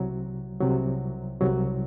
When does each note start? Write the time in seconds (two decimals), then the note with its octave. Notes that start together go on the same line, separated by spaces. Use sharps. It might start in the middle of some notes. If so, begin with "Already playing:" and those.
Already playing: C2 C3 F#3
0.61 C2 C3 F#3
1.41 C2 C3 F#3